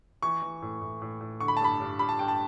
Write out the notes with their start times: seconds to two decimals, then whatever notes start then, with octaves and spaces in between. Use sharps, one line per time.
0.22 E3 C#6
0.43 E3
0.62 A2
0.82 A2
1.02 A2
1.21 A2
1.40 D3 C#6
1.48 B5
1.57 A5
1.61 G2 B5
1.81 G2
1.99 G2 B5
2.09 A5
2.19 G2 G5
2.28 A5